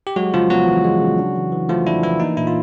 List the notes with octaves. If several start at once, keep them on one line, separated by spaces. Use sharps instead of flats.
G4
F#3 G#3 F#4
C#3 F3 F4
F#3 B3 F#4
E3
G#3
C#3
D4
E3
E3
F3 A3 F4
D4 E4
E3 E4
A#3 D#4
A#2 E4
F4